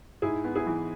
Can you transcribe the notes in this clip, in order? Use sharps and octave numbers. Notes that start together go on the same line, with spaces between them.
G#2 E4 G#4
B3
E4 G#4
E3